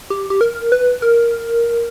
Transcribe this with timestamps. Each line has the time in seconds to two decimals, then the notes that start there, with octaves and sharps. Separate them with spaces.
0.10 G4
0.30 G4
0.41 A#4
0.72 B4
1.02 A#4